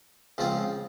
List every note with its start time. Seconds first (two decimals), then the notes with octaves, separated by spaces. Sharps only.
0.38 C#2 C#3 F3 C4 F4